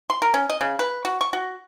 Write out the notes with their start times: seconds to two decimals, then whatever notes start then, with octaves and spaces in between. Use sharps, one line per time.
0.10 C6
0.22 A#4
0.34 C#4
0.50 D#5
0.61 C#3
0.79 B4
1.05 F#4
1.21 C#6
1.33 F#4